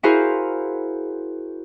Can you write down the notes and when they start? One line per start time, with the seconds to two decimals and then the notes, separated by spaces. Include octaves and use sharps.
0.03 E4 F#4 G#4 A#4 C5 F5